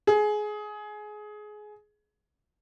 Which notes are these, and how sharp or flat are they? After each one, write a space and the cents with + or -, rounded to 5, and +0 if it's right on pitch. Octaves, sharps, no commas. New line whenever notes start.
G#4 +20